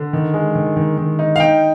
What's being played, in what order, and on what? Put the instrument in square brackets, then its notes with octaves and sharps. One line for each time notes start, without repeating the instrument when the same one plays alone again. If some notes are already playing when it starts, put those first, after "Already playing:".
Already playing: [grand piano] D3
D#3
G#3
D#3
D#3
D#3
D#4
F5
D#4 G5